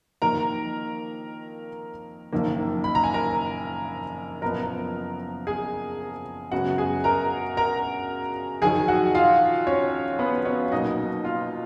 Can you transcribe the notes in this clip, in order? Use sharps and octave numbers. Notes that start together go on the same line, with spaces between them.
F2 D#3 A#3 A#4 A#5
F#1 F2 D#3 A#3
B5
A#5
G#5
A#4 A#5
F#1 F2 F3 B3 A#4 A#5
G#4 G#5
F#2 C#3 G#3 B3 F#4 F#5
G#4 G#5
A#4 A#5
A#4 A#5
F2 D#3 F#3 G#4 G#5
F#4 F#5
F4 F5
C#4 C#5
B3 B4
C#4 C#5
B1 B2 A#3 D#4 D#5
F4 F5